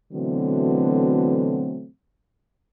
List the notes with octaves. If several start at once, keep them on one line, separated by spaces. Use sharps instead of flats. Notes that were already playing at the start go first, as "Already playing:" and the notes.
B2 D3 E3 F#3 A3 C4